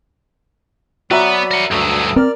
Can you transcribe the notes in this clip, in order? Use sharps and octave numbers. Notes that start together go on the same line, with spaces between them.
F#3 B3 F#4 D5 E5 A#5 B5
A#4 F#5
D2 G2 F#3 A4 D#6
C4 A#4 D5 F6